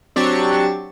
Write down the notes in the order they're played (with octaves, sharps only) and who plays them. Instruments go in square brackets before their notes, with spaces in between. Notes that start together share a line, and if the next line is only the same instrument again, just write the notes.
[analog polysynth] F#3 C4 D4 G4 C#6 A6